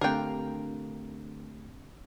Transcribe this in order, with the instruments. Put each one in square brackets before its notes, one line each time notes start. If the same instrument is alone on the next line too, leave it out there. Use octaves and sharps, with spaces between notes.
[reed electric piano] D3 A3 [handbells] C4 D4 G4 [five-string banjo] A#4 G5